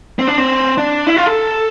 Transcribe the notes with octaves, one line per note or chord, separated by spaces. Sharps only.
C4
D4
C4
D4
E4
F4
A4